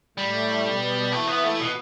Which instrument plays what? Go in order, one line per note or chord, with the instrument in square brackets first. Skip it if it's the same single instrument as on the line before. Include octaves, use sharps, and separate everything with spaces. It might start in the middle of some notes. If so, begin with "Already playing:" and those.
[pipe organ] A2 A3 [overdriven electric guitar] G3
[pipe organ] B2 B3
[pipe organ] E3 E4 [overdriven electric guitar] A3
[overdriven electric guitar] B3
A3
B2